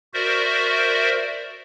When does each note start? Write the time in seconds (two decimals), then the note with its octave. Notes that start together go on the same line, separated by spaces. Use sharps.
0.14 F#4 A#4 C5 D5 E5